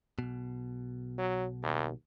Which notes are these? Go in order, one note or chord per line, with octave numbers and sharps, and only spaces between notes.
B1 B2
F#3
D#2